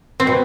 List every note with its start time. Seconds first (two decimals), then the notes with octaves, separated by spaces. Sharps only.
0.20 C4
0.27 B2